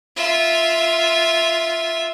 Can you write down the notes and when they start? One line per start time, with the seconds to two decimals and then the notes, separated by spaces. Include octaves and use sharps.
0.17 F4 E5